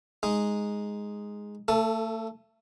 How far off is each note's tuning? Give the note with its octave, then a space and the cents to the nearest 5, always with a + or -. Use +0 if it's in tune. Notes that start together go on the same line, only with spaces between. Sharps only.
G#3 +0 D#4 +0
A3 +35 A4 +0